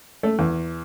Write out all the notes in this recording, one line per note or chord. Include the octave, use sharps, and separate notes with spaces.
A3
E2